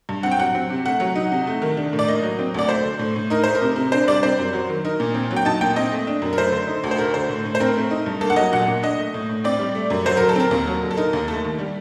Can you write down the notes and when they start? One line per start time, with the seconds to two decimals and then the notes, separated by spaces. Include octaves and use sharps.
0.09 G2
0.23 C4 F#5
0.31 G5
0.39 F#3 F#5
0.55 C4
0.70 C3
0.85 A3 F#5
1.00 F#3
1.15 D#4
1.32 C3
1.47 A3
1.62 D#3
1.77 D4
1.93 A2
1.99 D5
2.08 A#3 D#5
2.23 F#3
2.39 C4
2.54 D2 D5
2.69 A3 C5
2.85 D3
2.99 A2
3.16 A2
3.30 D#4 A#4
3.44 A3 C5
3.55 A#4
3.62 C3
3.76 C3
3.92 D4 C5
4.08 G3 D5
4.23 C4 C5
4.39 F#2
4.53 F#3
4.69 D#3
4.85 D#4 A#4
5.00 A#2
5.14 C4
5.31 F#3
5.36 G5
5.45 D#4 A5
5.61 A#2 G5
5.76 C4 D#5
5.91 A3
6.07 D4
6.22 F#2
6.33 A#4
6.37 A3 C5
6.52 D3
6.68 D#4
6.84 D2
6.91 C5
6.99 A3 A#4
7.14 D3 C5
7.29 A2
7.45 A2
7.55 C5
7.60 C4 A#4
7.76 A3
7.91 D#4
8.06 G2
8.21 A#3 A4
8.30 F#5
8.36 F#3 D#5
8.53 A#2 F#5
8.68 A#2
8.83 D4 D#5
8.98 A3
9.14 A2
9.30 A2
9.44 C4 D5
9.59 G3
9.75 A3
9.90 F#2
10.06 F#3 C5
10.17 D3 A#4
10.29 A4
10.36 C4 A#4
10.51 D#2
10.67 F#3
10.82 D3
10.91 A4
10.97 D#4 A#4
11.13 D#2
11.28 A3 A4
11.44 D#3
11.58 G3